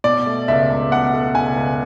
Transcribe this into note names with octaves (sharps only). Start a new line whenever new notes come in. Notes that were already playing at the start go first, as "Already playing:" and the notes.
B2 D5
A3
C#2 E5
C#2
B2 F#5
A3
C#2 G#5
C#2